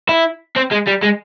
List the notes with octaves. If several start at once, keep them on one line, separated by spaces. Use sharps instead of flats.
E4
C4
G#3
G3
G#3